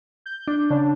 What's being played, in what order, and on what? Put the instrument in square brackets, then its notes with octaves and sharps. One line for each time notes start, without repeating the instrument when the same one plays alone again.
[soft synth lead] G6
[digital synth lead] D4
[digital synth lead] C#3 [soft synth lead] D4